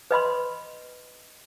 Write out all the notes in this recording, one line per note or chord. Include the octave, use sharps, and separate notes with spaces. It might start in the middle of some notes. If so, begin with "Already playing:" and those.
B4 D#5 B5 C6